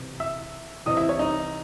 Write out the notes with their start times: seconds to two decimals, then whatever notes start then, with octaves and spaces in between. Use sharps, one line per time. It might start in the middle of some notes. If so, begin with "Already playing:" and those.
Already playing: C2 C3 E3
0.20 E5 E6
0.86 C2 C3 E3 D#5 D#6
0.97 E4 E5
1.09 C#5
1.19 D#4 D#5